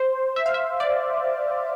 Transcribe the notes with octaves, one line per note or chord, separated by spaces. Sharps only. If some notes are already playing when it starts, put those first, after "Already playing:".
Already playing: C5
E5
F5
E5
D5